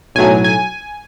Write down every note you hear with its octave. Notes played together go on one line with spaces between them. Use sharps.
B1 A2 F#3 G#5
G#5